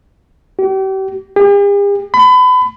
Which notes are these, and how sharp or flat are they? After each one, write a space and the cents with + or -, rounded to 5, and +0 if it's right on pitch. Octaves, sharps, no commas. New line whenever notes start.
G4 -40
G4 +45
B5 +30